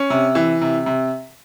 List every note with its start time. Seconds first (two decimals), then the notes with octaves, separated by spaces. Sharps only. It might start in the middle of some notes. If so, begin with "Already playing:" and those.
Already playing: C#4
0.10 C3
0.35 E3
0.61 C3
0.86 C3